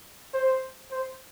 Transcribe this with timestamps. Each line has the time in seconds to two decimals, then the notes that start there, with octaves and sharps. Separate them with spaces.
0.34 C5
0.91 C5